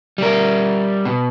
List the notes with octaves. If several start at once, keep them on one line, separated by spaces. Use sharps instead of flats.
G3 A#4
B2